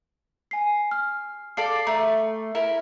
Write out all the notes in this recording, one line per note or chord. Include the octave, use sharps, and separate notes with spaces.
G#5 C7
F6
A4 D5 F5 C7
A3 A#5
E4 A#4 E5